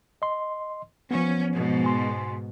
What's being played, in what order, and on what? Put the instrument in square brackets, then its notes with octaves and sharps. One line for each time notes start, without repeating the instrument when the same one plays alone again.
[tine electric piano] D#5 C6
[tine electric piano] F3 B3 [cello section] C#4
[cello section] G#2 B2
[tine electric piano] G#5 C6